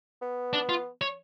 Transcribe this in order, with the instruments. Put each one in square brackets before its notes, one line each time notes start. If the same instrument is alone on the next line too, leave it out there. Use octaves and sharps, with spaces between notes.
[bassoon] B3
[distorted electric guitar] D4
F4
C#5